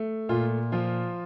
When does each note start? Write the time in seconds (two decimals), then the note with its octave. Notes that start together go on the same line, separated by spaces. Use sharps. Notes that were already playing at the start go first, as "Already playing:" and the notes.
Already playing: A3
0.29 A#2 F4
0.72 F3 F4